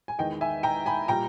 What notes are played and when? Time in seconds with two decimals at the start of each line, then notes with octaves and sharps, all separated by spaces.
0.08 G#5
0.18 E2 D#3 G#3 D#5 G5
0.41 E5 G#5
0.63 G5 A#5
0.86 G#5 B5
1.08 A#2 G3 G5 A#5